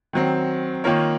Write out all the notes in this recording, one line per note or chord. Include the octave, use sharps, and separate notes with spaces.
D#3 F#3 C4
D#3 A#3 F4 A#4 C#5